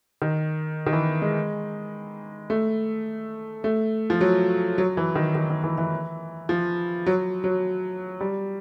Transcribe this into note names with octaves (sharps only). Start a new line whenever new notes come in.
D#3
D#3
E3
G#3
A3
A3
F3
F#3
F#3
E3
D#3
D#3
D#3
E3
E3
F3
F#3
F#3
G3